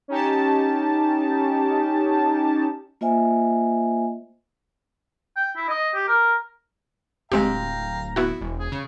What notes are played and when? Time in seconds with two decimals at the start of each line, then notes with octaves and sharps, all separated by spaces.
0.08 C#4 D#4 G4 A5
3.01 A#3 F4 C5 D#5 E5 G#5
5.36 G5
5.57 E4
5.69 D#5
5.95 G4
6.08 A#4
7.32 D1 G#3 C4 G4 F5 G5 A#5
8.16 B3 E4 F#4
8.41 E1
8.59 G#4
8.72 C#3